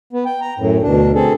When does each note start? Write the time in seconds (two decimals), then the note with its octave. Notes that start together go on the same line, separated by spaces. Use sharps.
0.13 B3
0.26 G5
0.41 A#5
0.58 F#2 A2
0.82 D2 B2 D4
1.15 C4 G#4 A4